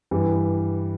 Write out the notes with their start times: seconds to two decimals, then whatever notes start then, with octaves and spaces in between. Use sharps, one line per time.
0.11 G2 E3 G3